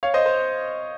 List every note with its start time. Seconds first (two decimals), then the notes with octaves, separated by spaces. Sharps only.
0.03 C#5 F5
0.14 C5 D#5
0.26 C5